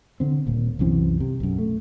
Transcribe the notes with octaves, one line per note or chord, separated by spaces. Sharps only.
D3 C4
D#1 A#2
C2 F#2 E3 C4
C3
B1 F#2
A3